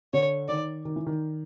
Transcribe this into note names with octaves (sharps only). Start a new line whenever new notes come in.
D3 C#5
D#3 D5
D#3
E3
D#3